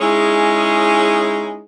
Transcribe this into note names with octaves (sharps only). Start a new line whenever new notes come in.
G#3 C#4 D#4 E4 G#4